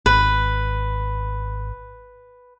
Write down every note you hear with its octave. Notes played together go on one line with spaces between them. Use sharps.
G#1 B4